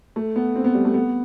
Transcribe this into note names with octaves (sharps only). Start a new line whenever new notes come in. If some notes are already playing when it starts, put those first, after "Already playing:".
A3
B3
C4
B3
G3
A3
B3